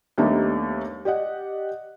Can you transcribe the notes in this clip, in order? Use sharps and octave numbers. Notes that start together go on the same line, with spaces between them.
D#2 G3 A3 B3 D4 D#4
G4 D5 D#5 F#5